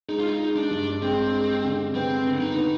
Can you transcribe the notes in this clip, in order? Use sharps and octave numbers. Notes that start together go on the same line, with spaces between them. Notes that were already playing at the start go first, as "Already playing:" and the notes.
G#3 D#4
F4
D#4
G#3
D4
G2
G#3 C4
G#3
D3
B3 C4
D3
D#4
B3